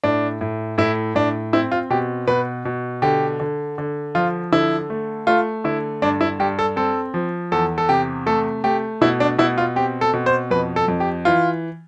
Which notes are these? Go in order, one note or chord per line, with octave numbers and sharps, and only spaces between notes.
A2 D4
A2
A2 E4
A2 D4
C4 E4
F4
B2 G4
B2 B4
B2
D3 G4
D3
D3
F3 F4
D3 E4
A3
A3 F4
D3 E4
G2 D4
E4
G2 G4
A4
C4 A4
F3
E2 A4
A4
C3 G4
A3 A4
A3 G4
B2 E4
D4
B2 E4
F4
C4 G4
A4
B2
C5
F2 B4
A4
F2
G4
E3 F4